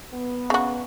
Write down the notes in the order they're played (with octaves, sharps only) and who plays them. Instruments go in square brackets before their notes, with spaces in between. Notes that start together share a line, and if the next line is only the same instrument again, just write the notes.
[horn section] B3
[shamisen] C#3 F#4